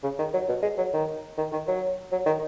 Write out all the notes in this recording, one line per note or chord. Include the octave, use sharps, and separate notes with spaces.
C#3
D#3
F#3
B2
G#3
F#3
D#3
D#3
D#3
F#3
F#3
D#3